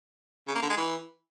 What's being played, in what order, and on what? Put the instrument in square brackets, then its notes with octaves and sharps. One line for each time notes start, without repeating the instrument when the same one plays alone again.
[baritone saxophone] C#3
A#3
D3
G#3
E3